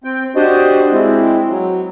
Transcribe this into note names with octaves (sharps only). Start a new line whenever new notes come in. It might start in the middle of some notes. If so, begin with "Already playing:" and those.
C4 G5
D4 F#4 G4 C5 D5 D#5
G#3 C4 E4
F#3